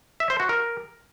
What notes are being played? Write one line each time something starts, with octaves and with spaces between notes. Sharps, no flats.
E5
C5
F#4
A#4